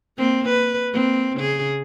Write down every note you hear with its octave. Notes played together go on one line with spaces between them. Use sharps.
A#3 C4
B4
A#3 C4
C#3 G#4